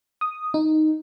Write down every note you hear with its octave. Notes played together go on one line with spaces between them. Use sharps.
D#6
D#4